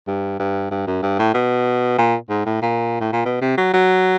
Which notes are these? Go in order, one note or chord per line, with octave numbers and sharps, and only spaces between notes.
G2
G2
G2
F#2
G2
A2
B2
A#2
G#2
A2
A#2
A2
A#2
B2
C3
F#3
F#3